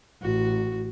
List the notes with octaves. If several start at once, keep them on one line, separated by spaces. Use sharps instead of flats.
A1 F#4